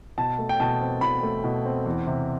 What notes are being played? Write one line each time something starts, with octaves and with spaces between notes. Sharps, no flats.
B2 A5
A3
G5
B2 A5
C4
B2 B5
A3
B2
C4
E2
C3